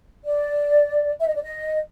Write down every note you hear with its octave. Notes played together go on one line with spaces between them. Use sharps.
D5
E5
D#5
D5
D#5